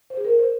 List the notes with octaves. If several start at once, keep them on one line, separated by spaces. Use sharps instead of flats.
C5
G#4
A#4
C5